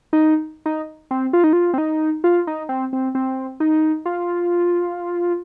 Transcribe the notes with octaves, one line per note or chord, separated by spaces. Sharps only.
D#4
D#4
C4
F4
D#4
F4
C4
D#4
F4
D#4
C4
C4
C4
D#4
F4